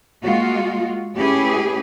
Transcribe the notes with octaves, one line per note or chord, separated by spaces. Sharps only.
G#3 A#3 F4 F#4
A3 C#4 E4 G4 G#4 B4